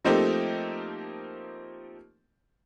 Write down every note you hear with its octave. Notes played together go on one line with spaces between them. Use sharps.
F3 A3 A#3 C4 D#4 G4